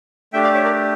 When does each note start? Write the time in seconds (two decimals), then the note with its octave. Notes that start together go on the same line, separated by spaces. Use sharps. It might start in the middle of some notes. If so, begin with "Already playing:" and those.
0.33 A3 D4 G4 E5 G5
0.44 D5 F5
0.54 C#5 E5
0.64 A#4 D5